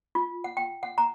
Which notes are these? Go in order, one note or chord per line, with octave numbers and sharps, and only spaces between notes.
F4
F#5
G5
F#5
A#5